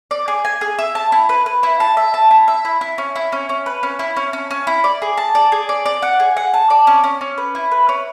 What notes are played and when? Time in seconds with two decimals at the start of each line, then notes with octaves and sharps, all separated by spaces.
0.11 D5
0.28 G#4
0.45 G#5
0.61 G#4
0.79 E5
0.95 A5
1.12 E4
1.29 B4
1.46 B4
1.63 E4
1.80 A5
1.97 E5
2.14 A5
2.31 E4
2.48 E5
2.65 E4
2.81 E4
2.98 C#4
3.16 E4
3.32 C#4
3.49 C#4
3.66 B4
3.83 C#4
3.99 E4
4.17 C#4
4.33 C#4
4.51 C#4
4.67 E4
4.84 D5
5.02 G#4
5.17 A5
5.35 D5
5.52 G#4
5.69 D5
5.86 D5
6.02 F#5
6.20 G#4
6.37 F#5
6.54 A5
6.70 D5
6.87 C#4
7.04 C#4
7.21 C#4
7.38 B4
7.55 E4
7.72 B4
7.89 C#4